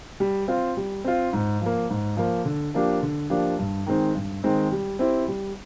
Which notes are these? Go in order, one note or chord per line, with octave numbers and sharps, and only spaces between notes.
G3
C4 F4
G3
C4 F4
G#2
F3 A#3
G#2
F3 A#3
D3
F3 A#3 D4 G4
D3
F3 A#3 D4 G4
G2
D#3 G#3 C4 D#4
G2
D#3 G#3 C4 D#4
G3
C4 E4 G4 C5
G3